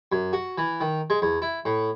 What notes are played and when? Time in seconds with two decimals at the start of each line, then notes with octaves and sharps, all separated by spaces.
0.12 F#2
0.33 F#4
0.58 E3
0.81 D#3
1.10 G#3
1.22 E2
1.42 E4
1.65 A2